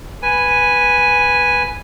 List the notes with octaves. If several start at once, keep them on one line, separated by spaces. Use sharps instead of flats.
B4 G#5